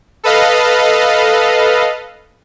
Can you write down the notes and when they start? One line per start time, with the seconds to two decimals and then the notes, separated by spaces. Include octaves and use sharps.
0.24 A4 B4 D#5 F5